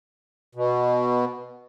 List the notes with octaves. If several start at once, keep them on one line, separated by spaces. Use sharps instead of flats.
B2